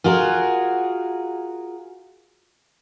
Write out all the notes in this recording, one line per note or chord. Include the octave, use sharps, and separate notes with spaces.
F4 F#4 G#4 A#4